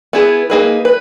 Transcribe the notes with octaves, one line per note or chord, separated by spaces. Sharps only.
B3 E4 G#4
A#3 D#4 G#4 B4
B4